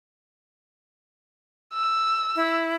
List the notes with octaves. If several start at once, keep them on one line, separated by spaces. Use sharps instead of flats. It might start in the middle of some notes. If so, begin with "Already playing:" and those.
E6
E4